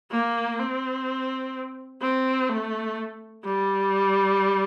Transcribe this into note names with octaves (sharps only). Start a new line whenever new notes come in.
A#3
C4
C4
A3
G3